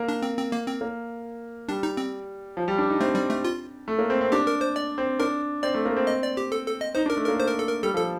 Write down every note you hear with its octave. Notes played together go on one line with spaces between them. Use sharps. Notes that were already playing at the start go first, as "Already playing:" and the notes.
Already playing: A#3
D4
C4
C4
A#3
C4
A#3
G3 D4
D#4
C4
F3
G3
D4
D#4
A3 C4
G3
A3
F4
A3
A#3
C4
C4
D4 G4
A#4
C5
D5
C4
D4 A#4
C4 D5
A3
A#3
C4
D#5
D5
G4
A4
A4
D#5
D#4 C5
D4
A#4
A3
A#3 A#4
C5
A#4
A4
A#4
G3 A4
F3
A4